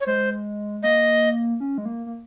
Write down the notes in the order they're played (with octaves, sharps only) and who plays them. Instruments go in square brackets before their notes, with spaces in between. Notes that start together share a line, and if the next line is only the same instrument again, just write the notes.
[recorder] C#5
[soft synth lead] G#3 [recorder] C5
[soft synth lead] A#3 [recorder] D#5
[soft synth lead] C#4
G#3
A#3
A#3